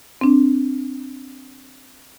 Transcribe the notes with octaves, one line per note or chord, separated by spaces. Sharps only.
C4 D4